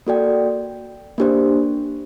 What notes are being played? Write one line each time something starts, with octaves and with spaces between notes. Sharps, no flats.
A#3 F#4 A4 D5 G5
A#3 D4 G4 C5